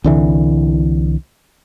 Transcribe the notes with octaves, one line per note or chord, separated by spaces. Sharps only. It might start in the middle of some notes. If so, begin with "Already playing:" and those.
C2 D3 E3